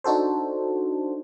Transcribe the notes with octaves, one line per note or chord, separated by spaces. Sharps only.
D4 D#4 F#4 A4 C5